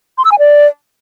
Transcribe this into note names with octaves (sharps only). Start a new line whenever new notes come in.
C6
E6
G#5
D5